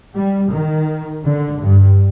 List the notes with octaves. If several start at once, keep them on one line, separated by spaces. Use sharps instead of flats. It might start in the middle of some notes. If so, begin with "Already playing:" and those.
G3
D#3
D3
G2